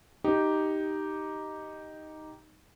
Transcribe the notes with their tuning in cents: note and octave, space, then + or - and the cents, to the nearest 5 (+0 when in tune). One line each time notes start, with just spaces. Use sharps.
D#4 +0 G4 -5